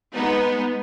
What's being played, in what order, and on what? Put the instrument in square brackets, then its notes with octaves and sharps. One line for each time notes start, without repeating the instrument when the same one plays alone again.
[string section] G#3 B3 D#4